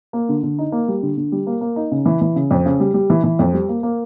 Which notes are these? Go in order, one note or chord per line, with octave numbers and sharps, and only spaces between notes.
A#3
D3
D3
D#4
A#3
G3
D3
D3
G3
A#3
A#3
D#4
C#3
E3
E3
C#3
F2
C#3
G3
G3
E3
E3
F2
G3
A#3
A#3